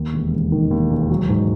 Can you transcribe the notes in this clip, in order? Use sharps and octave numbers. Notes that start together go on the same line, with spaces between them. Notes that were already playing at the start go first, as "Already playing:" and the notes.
Already playing: D#2
E1
E1
D#3
D#2
E1
F#3
G#2